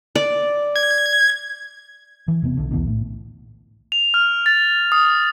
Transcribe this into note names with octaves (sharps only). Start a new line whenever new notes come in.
D5
G#6
E3
E1 C3 B3
B1 D3
B1 E2 B2 D3
A2
F7
F6
A6
D#6